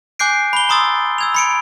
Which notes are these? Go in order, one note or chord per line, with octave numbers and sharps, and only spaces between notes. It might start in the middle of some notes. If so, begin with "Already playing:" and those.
G#5 D6 F#6 G6 C7 D7
B5 G7
A#5 C6 D#6 E6 A6
E6 G#6 F7
B5 C#7 D7